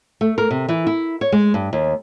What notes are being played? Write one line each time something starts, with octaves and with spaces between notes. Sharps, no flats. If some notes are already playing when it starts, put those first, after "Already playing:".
A3
A#4
C3
E3
E4
C#5
G#3
G2
D#2